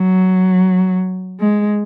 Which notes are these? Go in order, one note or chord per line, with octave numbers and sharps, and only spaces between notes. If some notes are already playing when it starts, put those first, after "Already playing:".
Already playing: F#3
G#3